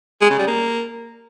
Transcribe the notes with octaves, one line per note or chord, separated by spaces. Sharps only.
G#3
C#3
G3
A#3